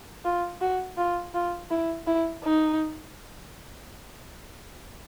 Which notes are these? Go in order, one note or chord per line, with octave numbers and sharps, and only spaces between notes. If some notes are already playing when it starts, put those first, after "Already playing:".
F4
F#4
F4
F4
E4
E4
D#4